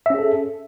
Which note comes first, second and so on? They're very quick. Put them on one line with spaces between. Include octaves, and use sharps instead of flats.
E5 C#4 G#4 A4